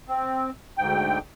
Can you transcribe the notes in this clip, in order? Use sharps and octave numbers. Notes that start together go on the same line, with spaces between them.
C4
D2 G#2 G5